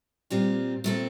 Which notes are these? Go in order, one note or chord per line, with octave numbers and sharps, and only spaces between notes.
A#2 G3 C4 F4
A#2 A3 C4